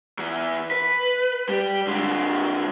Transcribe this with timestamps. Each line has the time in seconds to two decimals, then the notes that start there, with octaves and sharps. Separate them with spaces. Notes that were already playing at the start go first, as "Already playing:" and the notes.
0.19 E2 E3
0.71 B4
1.49 G3
1.87 D3 G#3